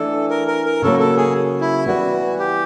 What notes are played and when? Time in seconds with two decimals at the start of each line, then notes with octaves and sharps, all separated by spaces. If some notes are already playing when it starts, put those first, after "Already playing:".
Already playing: E3 A3 D4 A4
0.30 A#4
0.48 A#4
0.66 A#4
0.82 C#3 F#3 A#3 A4
0.99 A4
1.17 G#4
1.61 E4
1.86 E3 G3 B3 F#4
2.39 G4